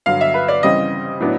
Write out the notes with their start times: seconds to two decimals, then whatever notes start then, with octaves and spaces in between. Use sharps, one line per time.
0.06 G2 D3 F#3 F5
0.21 E5
0.34 B4
0.48 D5
0.63 C#3 E3 G3 C4 D#5
1.20 A2 F#3 B3 D4